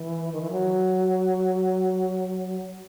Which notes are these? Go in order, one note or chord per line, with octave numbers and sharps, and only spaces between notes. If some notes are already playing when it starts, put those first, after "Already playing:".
Already playing: E3
D#3
E3
F#3